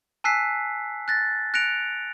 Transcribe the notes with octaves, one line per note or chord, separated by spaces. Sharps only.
G#5 A5 E6 F#6 B6 C7
F#6 A6 A#6
F#6 A#6 C#7 D7 F7